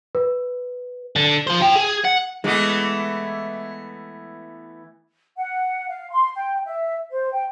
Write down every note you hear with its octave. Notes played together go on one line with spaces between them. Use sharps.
B4
D3
F4 C5
F4 G5
G#4
F#5
E3 G#3 A3 B3
F#5
F5
C6
G5
E5
C5
G5